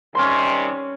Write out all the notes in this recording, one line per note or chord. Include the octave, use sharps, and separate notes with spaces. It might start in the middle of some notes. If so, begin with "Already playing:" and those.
C3 D#3 G3 C#4 C6